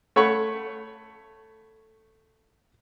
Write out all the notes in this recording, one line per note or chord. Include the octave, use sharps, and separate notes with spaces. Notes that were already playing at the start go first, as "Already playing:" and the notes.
A3 C#5 F#5 B5 C#6